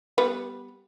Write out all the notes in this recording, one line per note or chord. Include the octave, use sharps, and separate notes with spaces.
G3 B3 B4